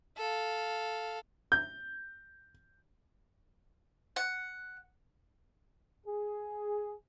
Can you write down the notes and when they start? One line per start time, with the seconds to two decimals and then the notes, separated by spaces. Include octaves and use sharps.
0.17 A4 F5
1.52 G6
4.16 F#5
6.05 G#4